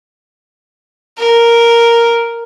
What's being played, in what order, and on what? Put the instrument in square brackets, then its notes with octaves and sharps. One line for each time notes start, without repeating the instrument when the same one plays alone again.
[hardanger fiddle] A#4